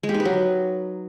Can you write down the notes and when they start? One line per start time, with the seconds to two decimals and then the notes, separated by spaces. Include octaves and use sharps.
0.03 G#3
0.09 G4
0.14 D#4
0.20 B4
0.25 F#3